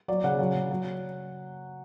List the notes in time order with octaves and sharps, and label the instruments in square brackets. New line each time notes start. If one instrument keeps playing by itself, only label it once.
[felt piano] F#3 D5
C#3 F#5
F#3
C#3
F#3